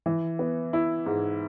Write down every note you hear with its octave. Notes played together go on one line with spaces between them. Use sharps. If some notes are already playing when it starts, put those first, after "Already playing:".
E3
B3
E4
G#2